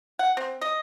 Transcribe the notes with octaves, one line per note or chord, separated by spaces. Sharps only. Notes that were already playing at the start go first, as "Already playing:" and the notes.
F#5
C4
D#5